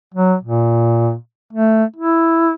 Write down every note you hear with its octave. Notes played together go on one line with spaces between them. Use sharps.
F#3
A#2
A3
E4